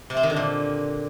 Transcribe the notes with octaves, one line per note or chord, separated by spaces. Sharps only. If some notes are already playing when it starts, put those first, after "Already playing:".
C3
C4
D#3
D3
A#2